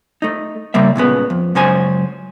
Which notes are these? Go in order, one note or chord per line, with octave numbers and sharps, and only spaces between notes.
A3 D#4
C#3 G3 A#3 E5
C#2 A#2 C#3 B3
F2
C#2 F#2 C#4 C5 G#5